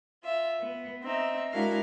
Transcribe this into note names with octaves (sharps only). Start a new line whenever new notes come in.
F4 E5
B3
C4 D#4 E5
G#3 D4 E4 F#4 A#4 F5